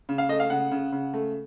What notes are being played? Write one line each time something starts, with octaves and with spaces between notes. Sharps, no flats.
C#3
F5
A3 D#5
F5
C#3 F#5
C#3
C#3
A3